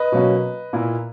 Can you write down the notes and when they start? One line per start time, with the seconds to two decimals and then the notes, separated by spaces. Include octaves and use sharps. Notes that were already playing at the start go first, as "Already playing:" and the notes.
Already playing: B4 D#5
0.12 B2 F#3 A#3 C#4
0.73 A#2 A#3 E4